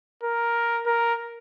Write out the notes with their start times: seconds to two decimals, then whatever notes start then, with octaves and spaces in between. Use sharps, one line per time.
0.23 A#4
0.86 A#4